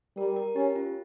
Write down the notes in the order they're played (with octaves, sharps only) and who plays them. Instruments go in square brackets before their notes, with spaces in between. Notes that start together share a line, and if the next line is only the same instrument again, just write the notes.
[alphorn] G3 [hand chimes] A#4
[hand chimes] A#4
[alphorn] C#4 [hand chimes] G4
[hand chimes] F4